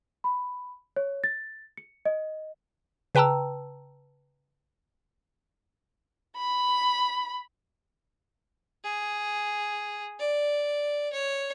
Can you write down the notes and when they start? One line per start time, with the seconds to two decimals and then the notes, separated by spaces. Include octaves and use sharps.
0.24 B5
0.96 C#5
1.24 A6
1.77 C#7
2.05 D#5
3.15 C#3 B4 G5 A5 A#5 E6
6.37 B5
8.84 G#4
10.19 D5
11.13 C#5